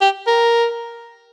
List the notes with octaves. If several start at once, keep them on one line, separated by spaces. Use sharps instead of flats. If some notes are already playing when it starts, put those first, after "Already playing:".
G4
A#4